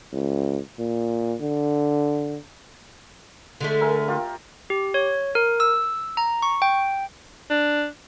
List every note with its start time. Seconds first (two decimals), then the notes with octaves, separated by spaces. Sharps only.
0.13 C#2
0.79 A#2
1.41 D3
3.61 D3 G#3 A3
3.81 A#4 E5 G#5
4.08 F4 G4
4.70 G4
4.94 C#5
5.35 A#4
5.60 E6
6.17 A#5
6.42 C#6
6.62 G5
7.50 D4